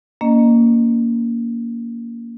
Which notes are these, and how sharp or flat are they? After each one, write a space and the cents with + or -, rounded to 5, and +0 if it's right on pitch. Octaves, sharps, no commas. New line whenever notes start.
A#3 +0 C#4 +35 D#5 -25